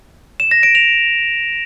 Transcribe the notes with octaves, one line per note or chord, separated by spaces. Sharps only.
E7
A#6
D7
F7